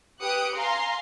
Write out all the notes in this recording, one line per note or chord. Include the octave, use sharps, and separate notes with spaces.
G4 B4 D#6 F#6 C#7 D7
F5 G#5 A#5 C6